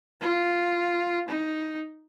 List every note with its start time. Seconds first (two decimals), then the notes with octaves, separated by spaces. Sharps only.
0.21 F4
1.28 D#4